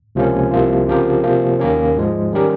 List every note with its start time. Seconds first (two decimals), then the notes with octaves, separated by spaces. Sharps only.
0.15 C#2 C3 F3 A#3 C#4
0.51 C2 C3 F3 A#3 F4
0.88 C#3 F3 C4 G4 A#4
1.24 C3 F3 A#3
1.59 D#2 D#3 A#3 C#4
1.97 G#2 F3 G#3
2.33 D#3 G3 C#4 G4 A#4